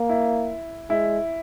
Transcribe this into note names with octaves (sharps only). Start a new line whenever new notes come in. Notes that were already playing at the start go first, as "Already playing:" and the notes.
Already playing: A#3
E4
G#3 E4